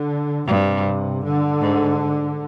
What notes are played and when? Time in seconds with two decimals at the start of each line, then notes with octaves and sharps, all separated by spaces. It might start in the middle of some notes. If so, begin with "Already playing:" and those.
Already playing: D3
0.47 G2 C3
1.23 D3
1.61 G#2